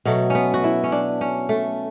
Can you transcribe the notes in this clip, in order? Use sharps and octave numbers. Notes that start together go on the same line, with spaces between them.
B2 F#3 A3
B3 C#4
F#4
E4
C#4
D4
C#4
A3